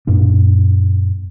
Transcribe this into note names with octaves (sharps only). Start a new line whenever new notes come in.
F#2 A#2 D4